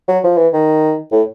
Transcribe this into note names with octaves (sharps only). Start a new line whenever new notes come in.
F#3
F3
E3
D#3
A2